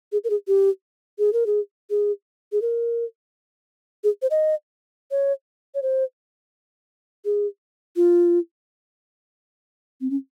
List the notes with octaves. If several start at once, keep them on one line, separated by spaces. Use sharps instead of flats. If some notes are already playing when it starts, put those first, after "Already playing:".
G#4
A#4
G#4
G4
G#4
A#4
G#4
G#4
G#4
A#4
G#4
C5
D#5
C#5
C#5
C5
G#4
F4
C4
C#4